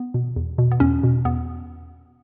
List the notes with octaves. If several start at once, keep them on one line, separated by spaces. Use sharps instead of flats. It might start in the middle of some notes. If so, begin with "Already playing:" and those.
Already playing: B3
B2
E2
B2
B3
E2 C#4
B2
E2 B3